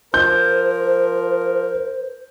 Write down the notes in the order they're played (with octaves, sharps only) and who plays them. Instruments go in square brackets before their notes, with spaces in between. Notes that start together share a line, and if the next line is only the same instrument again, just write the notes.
[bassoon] F3 [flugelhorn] A#4 [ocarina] C5 [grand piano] G6